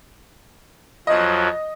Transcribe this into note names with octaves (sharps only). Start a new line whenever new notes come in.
F2 F3 F#3 D#5